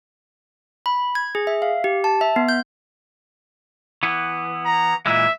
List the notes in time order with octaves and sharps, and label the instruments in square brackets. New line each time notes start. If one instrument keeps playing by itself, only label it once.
[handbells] B5
G#6
G#4
E5
F5
G4
A5
E5
B3
G6
[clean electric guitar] E3 B3
[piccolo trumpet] A#5
[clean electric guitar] A#2 E3 G#3 [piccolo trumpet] E5